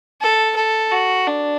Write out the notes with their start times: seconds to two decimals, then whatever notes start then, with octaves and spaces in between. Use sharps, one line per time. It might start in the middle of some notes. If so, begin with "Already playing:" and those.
0.21 A4
0.57 A4
0.92 F#4
1.27 D4